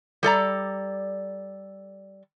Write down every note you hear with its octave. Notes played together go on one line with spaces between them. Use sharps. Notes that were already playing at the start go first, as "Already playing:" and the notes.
G3 A4 D5 A#5